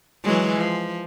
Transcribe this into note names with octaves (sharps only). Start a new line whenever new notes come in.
E3 F#3 G#3
F3